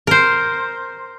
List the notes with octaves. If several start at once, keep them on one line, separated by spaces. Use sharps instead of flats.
A#4 C5